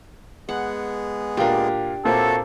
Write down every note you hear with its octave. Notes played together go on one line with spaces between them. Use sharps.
G#3 B3 G#4 F#5
A#2 D4 F4 G4 A#4
A#2 A#3 C4 F#4 A4 C#5 E5